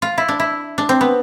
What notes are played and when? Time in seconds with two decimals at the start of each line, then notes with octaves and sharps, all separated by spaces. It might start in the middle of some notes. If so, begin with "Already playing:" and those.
0.02 F4
0.18 E4
0.28 D4
0.40 E4
0.78 D4
0.89 C4
1.01 B3